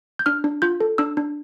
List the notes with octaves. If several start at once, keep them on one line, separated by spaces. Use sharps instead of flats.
G6
D4 F6
D4
F4 G6
A4
D4 E6
D4